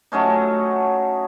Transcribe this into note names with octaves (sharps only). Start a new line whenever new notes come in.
F#3 A3 C#4 D#4